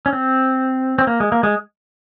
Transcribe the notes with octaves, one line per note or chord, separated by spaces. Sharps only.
C#4
C4
C4
A#3
G#3
A#3
G#3